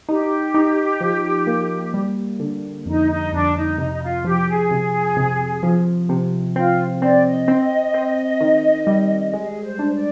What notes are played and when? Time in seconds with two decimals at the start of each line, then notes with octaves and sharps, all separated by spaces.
0.08 D#4 G4
0.54 D#4
1.01 F3
1.47 A#3
1.94 G3
2.40 D3
2.86 F2 D#4
3.09 D#4
3.32 F2 D4
3.55 D#4
3.78 C3 D#4
3.92 D#4
4.01 F4
4.24 F3 G4
4.48 G#4
4.71 C3
5.17 C3
5.63 F3
6.09 C3
6.55 C4 F4
7.01 C4 D5
7.25 D#5
7.48 C4
7.94 C4
8.41 D#3
8.87 G3
9.33 G#3 G#4
9.64 C5
9.79 D4
9.95 D5